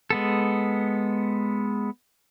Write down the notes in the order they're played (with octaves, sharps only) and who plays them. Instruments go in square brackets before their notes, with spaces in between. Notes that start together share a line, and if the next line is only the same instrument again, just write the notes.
[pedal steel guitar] G#3 B3 A4